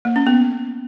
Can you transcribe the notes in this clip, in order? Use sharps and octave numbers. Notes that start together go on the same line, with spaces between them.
A#3
C#4
B3